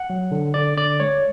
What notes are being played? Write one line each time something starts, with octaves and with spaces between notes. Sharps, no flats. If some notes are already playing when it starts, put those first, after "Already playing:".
Already playing: F#5
F#3
D3
D3 D5
D3 D5
G#3 C#5